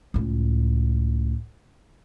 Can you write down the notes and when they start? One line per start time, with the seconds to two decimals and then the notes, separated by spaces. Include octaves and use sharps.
0.14 C#2 A2